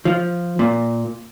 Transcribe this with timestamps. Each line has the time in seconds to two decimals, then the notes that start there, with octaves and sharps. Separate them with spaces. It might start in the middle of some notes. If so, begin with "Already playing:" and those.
0.05 F3
0.59 A#2